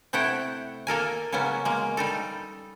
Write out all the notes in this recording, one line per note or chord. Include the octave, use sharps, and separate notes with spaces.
C3 A3 E4 F#5 G5
A#3 A4 A#4 G#5
C#3 F#3 A#3 B3 C#4
G#3 A#3
G3 D#4 A4